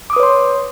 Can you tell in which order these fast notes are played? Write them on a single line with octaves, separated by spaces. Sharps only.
D6 D#6 B4 C#5 C6